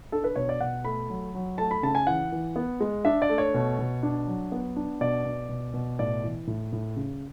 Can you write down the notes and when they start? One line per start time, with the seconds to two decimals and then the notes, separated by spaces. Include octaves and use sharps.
0.12 D4 A4
0.24 B4
0.36 B2 C#5
0.49 D5
0.61 B2 F#5
0.85 A3 B5
1.10 F#3
1.35 F#3
1.58 A3 A5
1.71 B5
1.83 C#3 A5
1.95 G#5
2.07 E3 F#5
2.32 E3
2.56 B3
2.80 G#3
3.05 D4 E5
3.22 D5
3.29 A3
3.38 C#5
3.54 B2
3.79 B2
4.03 D4
4.27 F#3
4.52 B3
4.76 D4
5.01 B2 D5
5.26 B2
5.49 B2
5.74 B2
5.99 A2 D5
6.24 E3
6.47 A2
6.73 A2
6.96 C#3